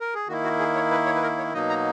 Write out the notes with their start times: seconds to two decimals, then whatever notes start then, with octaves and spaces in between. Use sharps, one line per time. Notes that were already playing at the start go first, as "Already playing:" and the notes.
0.01 A#4
0.14 G#4
0.28 D#3 A#3 E4 F#4
0.44 F#4
0.59 G#4
0.75 C#5
0.91 B4
1.06 C#5
1.15 B4
1.23 A#4
1.38 C#5
1.54 B2 F#3 A#3 D#4 D#5
1.70 A#5